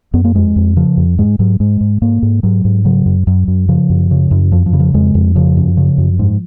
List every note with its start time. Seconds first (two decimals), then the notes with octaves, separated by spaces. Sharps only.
0.14 F#2 B3
0.24 A#3
0.35 F2 G#3
0.56 F2
0.77 C#3 F3
0.97 F2
1.18 G#2 G#3
1.39 G#2 F#3
1.60 G#2 G#3
1.81 G#2
2.02 G#2 A#3
2.22 G#2
2.43 G#2 F#3
2.65 G#2
2.85 C#3 F#3
3.06 F#2
3.27 F#2 F#3
3.48 F#2
3.68 C#3 F3
3.89 F#2
4.11 C#3
4.31 F#2
4.52 F2 F3
4.66 F3
4.73 C#3
4.80 F3
4.94 F2 G#3
5.15 F2
5.35 C#3 F3
5.57 F#2
5.77 C#3
5.98 F#2
6.19 G#2